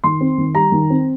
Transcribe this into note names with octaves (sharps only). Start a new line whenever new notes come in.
D#3 C6
C4
D#3
G3 A#5
D#3
C4